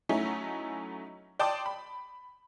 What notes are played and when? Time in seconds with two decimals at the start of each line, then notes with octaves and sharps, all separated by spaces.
0.09 F#3 A3 C#4 D#4 E4
1.39 D5 G5 A5 C6 D6 D#6
1.66 B5